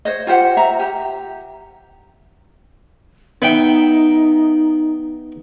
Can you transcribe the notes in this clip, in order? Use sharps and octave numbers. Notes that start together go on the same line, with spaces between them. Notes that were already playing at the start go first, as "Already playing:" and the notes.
C5 C#5 D#5
F4 G4 C5 F#5
E5 A#5
G4
B3 D#4 E5 G5